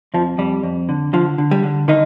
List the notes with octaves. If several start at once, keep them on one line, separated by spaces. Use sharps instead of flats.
F2 F3
F2 G3
F2
D3
D3 F3
D3
G3
D3
D3 D#3 D#4